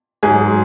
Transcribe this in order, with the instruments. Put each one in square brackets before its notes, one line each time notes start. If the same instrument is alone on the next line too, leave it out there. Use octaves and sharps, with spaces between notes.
[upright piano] G#2 F#3 G#4